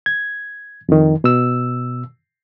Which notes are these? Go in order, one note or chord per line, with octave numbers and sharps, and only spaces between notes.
G#6
F2 D#3
B2 E6